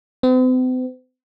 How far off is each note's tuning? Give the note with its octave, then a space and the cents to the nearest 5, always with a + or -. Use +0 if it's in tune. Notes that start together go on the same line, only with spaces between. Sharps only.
C4 -45